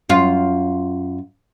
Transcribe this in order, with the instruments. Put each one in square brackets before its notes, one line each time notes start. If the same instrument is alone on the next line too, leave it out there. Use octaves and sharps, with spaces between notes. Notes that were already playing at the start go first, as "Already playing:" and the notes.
[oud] F#2 F4